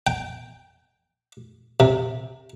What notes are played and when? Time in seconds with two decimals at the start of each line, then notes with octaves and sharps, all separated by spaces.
0.07 G5
1.80 C3